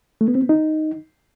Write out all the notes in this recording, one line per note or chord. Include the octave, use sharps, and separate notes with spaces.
A3
B3
C4
B3
D#4